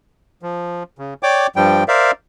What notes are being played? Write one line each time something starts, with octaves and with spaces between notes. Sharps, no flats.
F3
C#3
C#5 D5 G5 D6
G2 F3 G3 G5
A#4 C5 D5 E5 F5